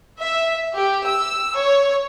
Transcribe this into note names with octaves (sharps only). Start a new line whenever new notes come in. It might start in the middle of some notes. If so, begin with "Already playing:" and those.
E5
G4
E6
C#5